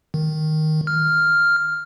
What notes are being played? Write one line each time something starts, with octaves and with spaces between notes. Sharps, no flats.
D#3
F6